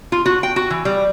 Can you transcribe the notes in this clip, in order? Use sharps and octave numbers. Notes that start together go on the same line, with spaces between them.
F4
F#4
G5
F#4
E3
G3